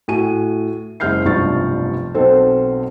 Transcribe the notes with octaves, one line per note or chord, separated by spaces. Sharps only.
A2 F#4 G#5 D#7
F#1 G#3 E5 F6 G6 C7
F1 B1 G2 F3 C#6 A6
B1 B2 C4 A4 C5